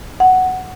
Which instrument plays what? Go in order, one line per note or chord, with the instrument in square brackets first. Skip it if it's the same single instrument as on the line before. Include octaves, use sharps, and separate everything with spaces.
[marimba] F#5